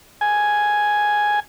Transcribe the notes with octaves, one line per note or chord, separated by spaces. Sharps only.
G#5